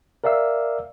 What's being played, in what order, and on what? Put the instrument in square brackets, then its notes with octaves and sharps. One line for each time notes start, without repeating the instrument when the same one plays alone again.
[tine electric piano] A#4 D5 E5 F5 E6